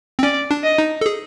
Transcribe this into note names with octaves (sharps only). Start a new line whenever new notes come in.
C4
C#4 D5
D4
D#5
D#4
A4
G#4